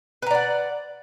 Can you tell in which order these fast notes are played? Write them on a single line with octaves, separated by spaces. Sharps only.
B4 A#5 D5 F#5